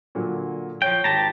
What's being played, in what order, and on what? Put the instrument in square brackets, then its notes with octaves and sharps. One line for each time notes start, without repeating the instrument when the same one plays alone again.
[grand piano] A#2 D3 F#3
[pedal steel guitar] F3 G5 [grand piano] C#5
[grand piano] G#1 [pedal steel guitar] G4 A5 A#5